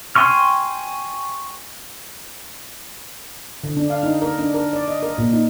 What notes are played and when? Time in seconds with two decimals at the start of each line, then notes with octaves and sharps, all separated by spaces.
0.16 G5 G#5 C6 C#6 F6
3.64 D3
3.77 D4
3.90 F5
4.03 D#4
4.22 A#4
4.39 D4
4.54 A#4
4.73 D5
4.88 D#5
5.03 A#4
5.18 A#2
5.33 D#4